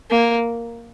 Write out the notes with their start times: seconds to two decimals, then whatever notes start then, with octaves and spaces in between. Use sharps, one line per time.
0.10 A#3